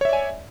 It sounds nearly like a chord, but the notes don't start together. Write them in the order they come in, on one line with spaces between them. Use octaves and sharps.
C#5 E5 D5 G#5